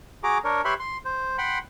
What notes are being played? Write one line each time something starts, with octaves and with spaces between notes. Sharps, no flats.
F#4 G#4 A#5 D6
D4 A#4 C#5
G4 B4 C#5 E5 B5 C6
C6
C5
F#5 G5 B5 C6